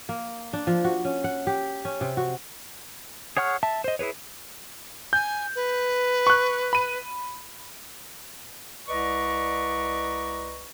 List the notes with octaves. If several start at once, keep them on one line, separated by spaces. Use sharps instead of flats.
A#3
D4
F3
F#4
C#4
F#5
G4
C#4
C3
F#4
G#4 C#5 F#5 C#6 F6
E5 A5
C5 D#5
E4 G#4 B4 C#5
G#5 G6
B4
C#6 F#6
B5 D#7
C2 B4 D5 D#5 A#5 C#6